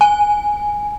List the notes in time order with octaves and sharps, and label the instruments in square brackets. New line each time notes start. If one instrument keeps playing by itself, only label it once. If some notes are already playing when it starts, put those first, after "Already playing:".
[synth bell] G#5